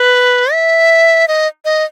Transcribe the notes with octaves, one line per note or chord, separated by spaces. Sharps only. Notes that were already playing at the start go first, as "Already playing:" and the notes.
Already playing: B4
E5
D#5
D#5